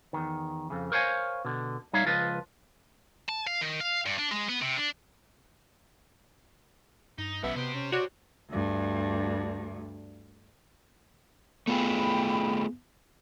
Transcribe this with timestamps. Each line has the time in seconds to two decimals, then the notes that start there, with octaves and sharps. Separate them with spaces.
0.13 E2 D#3
0.70 F2 C#3
0.92 A#4 C5 C#5 F5 G5 G#5
1.45 B2 D3
1.93 G3 D#4 C#5 E5 F5
2.05 C#2 F3 F4 B4 D#5
3.28 A5
3.47 F5
3.61 D#3
3.80 F5
4.06 G2
4.19 D4
4.32 G#3
4.49 B3
4.62 C3
4.77 D4
7.18 G2 D#4
7.43 A#1 F#2 B2 B3 E5
7.56 C3 B3 G4 C5
7.74 C#4
7.92 F#4 C#5 D5
8.50 D2 G2
11.67 A3 B3 F4 G#4 G5 B5